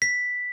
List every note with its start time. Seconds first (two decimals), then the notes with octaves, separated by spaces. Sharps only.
0.02 B6